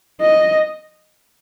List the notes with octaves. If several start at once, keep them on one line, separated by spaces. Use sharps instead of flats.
D#5